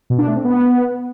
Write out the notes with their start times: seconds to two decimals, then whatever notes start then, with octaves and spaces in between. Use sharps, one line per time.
0.10 B2
0.19 D4
0.27 A3
0.36 C4
0.44 B3